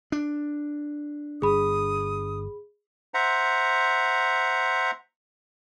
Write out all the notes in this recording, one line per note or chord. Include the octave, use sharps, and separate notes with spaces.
D4
G1 G#4 B5 D#6
C5 E5 F#5 A#5